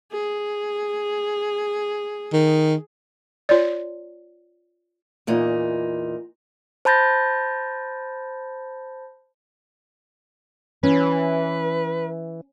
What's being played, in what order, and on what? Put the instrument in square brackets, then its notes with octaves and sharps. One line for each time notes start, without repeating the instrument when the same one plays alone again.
[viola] G#4
[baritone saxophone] D#3
[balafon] F4 C#5 D5
[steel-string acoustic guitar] E2 A#2 D#4
[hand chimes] C5 A5 B5 G6 A6 A#6
[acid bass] E3 [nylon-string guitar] C#4 [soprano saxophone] B4